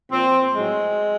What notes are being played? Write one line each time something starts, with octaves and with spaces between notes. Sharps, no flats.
A#2 F3 C4
A2 F#3 G#3